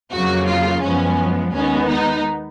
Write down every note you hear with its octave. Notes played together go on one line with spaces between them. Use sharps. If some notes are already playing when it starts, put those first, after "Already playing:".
F2 C#3 F#3 A#3 F#4
F4
F#2 F3 G#3 B3 C#4
D#2 D#3 G#3 B3 C#4
D#4